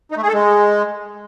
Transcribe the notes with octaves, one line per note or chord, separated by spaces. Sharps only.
D#4
A3
G#4
A4
G#3